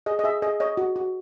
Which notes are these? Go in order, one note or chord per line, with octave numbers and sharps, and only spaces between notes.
G#4 D#5
D#5
G#4 E5
G#4 D#5
C#5 D#5
F#4
F#4